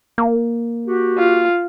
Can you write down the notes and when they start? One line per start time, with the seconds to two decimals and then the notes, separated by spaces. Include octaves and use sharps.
0.18 A#3
0.86 F#4 G4
1.18 F4